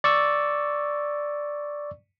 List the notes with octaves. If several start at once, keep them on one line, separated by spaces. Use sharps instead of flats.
D5 C#6 E6